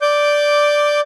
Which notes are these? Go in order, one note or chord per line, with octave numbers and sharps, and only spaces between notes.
D5 D6 G6